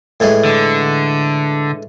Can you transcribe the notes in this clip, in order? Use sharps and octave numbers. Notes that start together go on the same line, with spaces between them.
A2 E3 G#3
D3